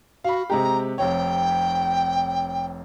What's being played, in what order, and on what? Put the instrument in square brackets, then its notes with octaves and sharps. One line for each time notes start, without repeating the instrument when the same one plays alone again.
[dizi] F#4 [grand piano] F5 B5
[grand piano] C3 G#3 G4 [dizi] A#5
[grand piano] F1 C3 C#5 [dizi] G5